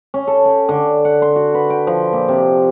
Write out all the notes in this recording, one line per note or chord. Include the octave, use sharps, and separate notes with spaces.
C#4
A4
G5
D3
F#5
C6
F#4
B4
G5
F3
A#2
C3